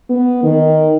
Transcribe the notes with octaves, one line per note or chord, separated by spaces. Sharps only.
B3
D#3